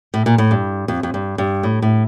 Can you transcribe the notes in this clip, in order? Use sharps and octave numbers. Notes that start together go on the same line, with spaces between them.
A2
A#2
A2
G2
F2
F2
G2
G2
A2
A2